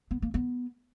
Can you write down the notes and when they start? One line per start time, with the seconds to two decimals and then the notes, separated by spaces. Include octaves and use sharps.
0.11 B3
0.22 A#3
0.34 B3